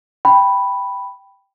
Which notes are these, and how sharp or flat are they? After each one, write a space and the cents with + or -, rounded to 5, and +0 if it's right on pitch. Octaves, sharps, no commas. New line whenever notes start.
G5 +0 B5 +0